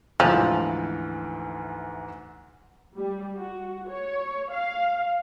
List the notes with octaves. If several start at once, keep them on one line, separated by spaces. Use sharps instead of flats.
D2 G#2 E3 F3
G3
F#4
C#5
F5